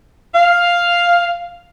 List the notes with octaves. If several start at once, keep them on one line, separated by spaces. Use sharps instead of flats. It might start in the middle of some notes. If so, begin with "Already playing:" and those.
F5